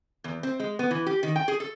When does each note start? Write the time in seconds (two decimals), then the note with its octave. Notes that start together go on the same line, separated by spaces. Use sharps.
0.24 E2
0.43 C4
0.60 G#3
0.79 B3
0.91 E3
1.06 G4
1.23 D#3
1.36 G5
1.48 G#4
1.60 A4